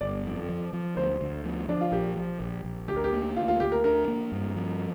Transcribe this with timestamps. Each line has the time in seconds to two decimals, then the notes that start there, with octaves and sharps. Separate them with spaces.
0.01 G1 D5
0.25 F2
0.49 F3
0.73 F3
0.97 D2 C5
1.21 D2
1.45 F3
1.68 F3 D4
1.81 F4
1.92 A#1 G4
2.17 F3
2.40 A#1
2.64 A#1
2.88 D2 G4
2.96 A#4
3.04 G4
3.12 A#3
3.36 D2 F4
3.48 F4
3.60 D2 G4
3.72 A#4
3.84 D4 A#4
4.08 A#3
4.32 G2
4.56 F3